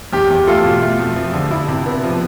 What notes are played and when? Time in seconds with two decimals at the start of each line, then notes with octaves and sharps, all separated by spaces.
0.13 E2 G4
0.30 E2
0.47 A3 F4 A4
0.65 B2
0.82 A3
0.99 F2
1.16 F3
1.33 D3
1.51 E4
1.68 C3
1.86 B3
2.03 F3